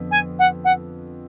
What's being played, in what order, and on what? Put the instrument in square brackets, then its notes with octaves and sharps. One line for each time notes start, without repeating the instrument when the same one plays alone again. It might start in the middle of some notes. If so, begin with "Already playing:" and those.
Already playing: [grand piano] F2 D3 B3
[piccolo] G#5
F#5
F#5